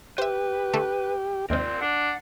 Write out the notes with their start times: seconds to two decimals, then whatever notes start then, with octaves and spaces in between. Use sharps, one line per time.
0.18 G4 B4 C5 E5
0.73 D3 A3 A4
1.50 D#2 G#2 C3 C4 A#4 D5
1.81 D4 F#5